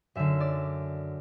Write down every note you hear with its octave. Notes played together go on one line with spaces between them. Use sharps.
F#2 D3 E5
D5